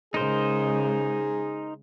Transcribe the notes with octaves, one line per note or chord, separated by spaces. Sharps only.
C#3 G#3 D#4 G#4 A#4 C5